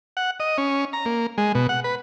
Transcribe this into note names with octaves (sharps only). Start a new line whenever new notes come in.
F#5
D#5
C#4
A#5
A#3
G#3
B2
F#5
B4